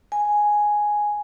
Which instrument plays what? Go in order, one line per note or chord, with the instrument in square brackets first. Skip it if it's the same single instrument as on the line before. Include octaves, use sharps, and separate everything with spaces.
[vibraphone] G#5